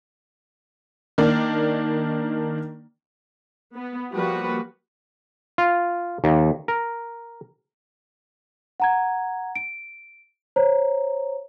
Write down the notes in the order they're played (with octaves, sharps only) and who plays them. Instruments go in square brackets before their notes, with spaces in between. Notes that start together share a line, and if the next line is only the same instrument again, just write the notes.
[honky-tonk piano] D#3 A#3 D4
[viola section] B3
F3 G3 A#3 F#4 B4
[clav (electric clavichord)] F4
D#2
A#4
[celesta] F#5 A#5 G#6
D7
C5 C#5 A#5